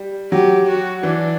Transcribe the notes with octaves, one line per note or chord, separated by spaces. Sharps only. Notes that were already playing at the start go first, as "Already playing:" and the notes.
Already playing: G3
F#3 G4
F#4
E3 D4